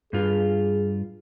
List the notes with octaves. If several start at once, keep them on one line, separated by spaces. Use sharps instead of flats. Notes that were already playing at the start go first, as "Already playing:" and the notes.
G2 F4 G#4